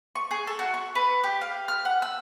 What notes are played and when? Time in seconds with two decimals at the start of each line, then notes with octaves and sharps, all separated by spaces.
0.15 C#6
0.31 G#4
0.47 A4
0.59 F#4
0.74 C#6
0.95 B4
1.24 G4
1.41 F5
1.68 F6
1.85 F#5
2.02 E6